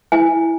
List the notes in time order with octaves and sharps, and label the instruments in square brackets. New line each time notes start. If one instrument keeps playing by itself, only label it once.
[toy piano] E4 G#5